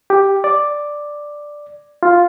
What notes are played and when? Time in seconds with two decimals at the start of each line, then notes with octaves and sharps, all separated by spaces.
0.10 G4
0.44 D5
2.03 F4